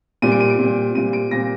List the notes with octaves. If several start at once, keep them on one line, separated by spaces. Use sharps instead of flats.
A#2 G3 C4 D#7
D7
D#7
D7
A#2 G3 C4
A#2 G3 C4 D#7
D7
A#2 G3 C4 A#6